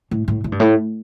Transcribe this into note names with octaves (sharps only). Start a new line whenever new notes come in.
A2
A2
A2
G2
A2